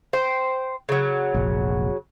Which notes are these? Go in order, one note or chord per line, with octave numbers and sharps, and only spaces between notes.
C5 G5
C#3 F#3
F1 A#1